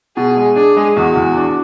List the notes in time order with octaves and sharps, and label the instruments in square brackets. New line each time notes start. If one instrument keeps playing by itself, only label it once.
[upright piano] B2 [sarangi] G#4
[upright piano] G#3
[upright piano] D4 [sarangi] G#4
[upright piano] G#3
[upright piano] E2 [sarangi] F#4
[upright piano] E2
D4